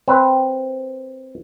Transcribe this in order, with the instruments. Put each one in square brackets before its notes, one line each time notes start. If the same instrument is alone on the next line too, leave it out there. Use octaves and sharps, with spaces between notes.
[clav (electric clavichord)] C4 B4